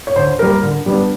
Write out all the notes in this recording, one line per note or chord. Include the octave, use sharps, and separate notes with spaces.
C#5
D3 C5
G3 A#3 A#4
D3
G3 B3 D4